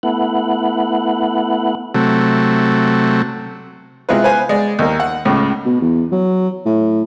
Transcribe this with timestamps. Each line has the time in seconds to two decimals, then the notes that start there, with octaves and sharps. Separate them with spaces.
0.03 A3 B3 E4 F#5
1.95 C3 F#3 A3
4.09 C3 G#3 C4 E4 F4 B4
4.24 B4 C5 F5 G#5
4.49 G#3 D5
4.79 D#2 A#3
5.00 F#5
5.25 C#2 A2 C#3
5.66 B2
5.81 E2
6.12 F#3
6.66 A2